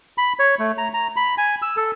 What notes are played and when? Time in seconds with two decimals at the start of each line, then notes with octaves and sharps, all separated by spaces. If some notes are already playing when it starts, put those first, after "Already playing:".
0.18 B5
0.39 C#5
0.59 A3
0.78 A#5
0.94 A#5
1.16 B5
1.38 G#5
1.62 E6
1.77 A4